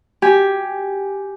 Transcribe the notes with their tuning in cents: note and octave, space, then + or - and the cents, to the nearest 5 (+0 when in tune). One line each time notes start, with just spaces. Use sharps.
G4 +0 G#5 +0